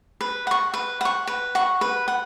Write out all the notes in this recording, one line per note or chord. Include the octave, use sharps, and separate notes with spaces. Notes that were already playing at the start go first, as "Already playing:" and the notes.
B4
F#5 C#6
B4
F#5 C#6
B4
F#5 C#6
B4
F#5